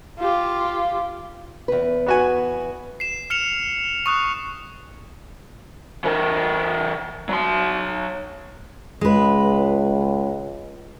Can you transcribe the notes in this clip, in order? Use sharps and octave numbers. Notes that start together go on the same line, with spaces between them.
F4 G4
E2 B4
B3 F#4 G#5
C7 E7
F6 C#7 E7 F7
C#6 D#6 F#6
E3 A#4
F#3 C6
C#2 G#3 B4